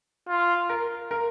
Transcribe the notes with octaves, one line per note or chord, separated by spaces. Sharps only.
F4
A#4
A#4